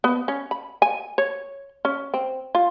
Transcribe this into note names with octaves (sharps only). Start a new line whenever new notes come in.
B3
C#4
B5
G#5
C#5
C#4
C4
F4